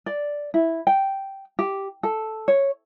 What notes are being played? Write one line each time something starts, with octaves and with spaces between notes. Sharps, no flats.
D5
E4
G5
G4
A4
C#5